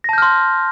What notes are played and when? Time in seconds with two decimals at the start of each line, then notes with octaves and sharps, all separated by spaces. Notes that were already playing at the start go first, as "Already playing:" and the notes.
0.04 A#6
0.09 A5
0.13 G6
0.18 F6
0.22 C6